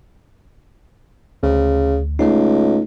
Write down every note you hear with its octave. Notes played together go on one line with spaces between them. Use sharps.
D2 C#3
C#2 A3 D#4